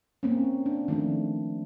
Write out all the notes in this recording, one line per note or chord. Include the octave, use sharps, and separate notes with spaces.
A#3 C4 C#4
D4
D#3 F3 A3 C4 D4